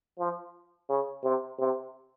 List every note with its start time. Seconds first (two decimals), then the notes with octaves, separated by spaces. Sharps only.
0.18 F3
0.89 C#3
1.23 C3
1.59 C3